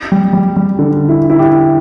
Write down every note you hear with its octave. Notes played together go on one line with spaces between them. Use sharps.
G3
G3
G3
D3
E4
E4
G4